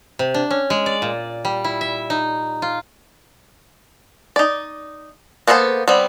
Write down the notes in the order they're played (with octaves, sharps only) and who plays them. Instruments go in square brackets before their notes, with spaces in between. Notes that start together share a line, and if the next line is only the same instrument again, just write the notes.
[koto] C3
D4
C#4
G#3
D5
A#2
G3
E4
E5
D#4
F4
[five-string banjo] D#4 D5
A#3 B3 A4 A#4 C5
G3 B3 C4